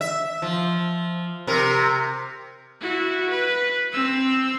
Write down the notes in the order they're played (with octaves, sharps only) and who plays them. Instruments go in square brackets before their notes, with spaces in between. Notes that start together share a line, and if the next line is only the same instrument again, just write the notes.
[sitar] E5
F3
C3 A#4
[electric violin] E4 F#4
B4
C4 E6